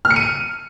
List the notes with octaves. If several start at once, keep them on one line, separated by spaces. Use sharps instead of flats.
F6
C#7
D#7